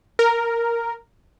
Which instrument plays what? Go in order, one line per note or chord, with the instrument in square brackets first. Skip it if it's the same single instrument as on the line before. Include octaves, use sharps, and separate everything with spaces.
[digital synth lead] A#4